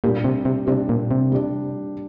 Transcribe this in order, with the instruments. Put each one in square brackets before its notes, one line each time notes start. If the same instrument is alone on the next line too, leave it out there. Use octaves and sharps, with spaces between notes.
[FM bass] A#2 [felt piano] G3 D4 G4
[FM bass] C3
C3
[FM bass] C3 [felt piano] G3 D4 G4
[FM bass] A#2
C3
[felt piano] G3 D4 G4